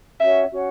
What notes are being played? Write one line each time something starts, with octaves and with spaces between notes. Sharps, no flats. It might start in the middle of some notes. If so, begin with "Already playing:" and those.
C#4 F#4 C#5 E5 F#5
C#4 F#4 C#5 F#5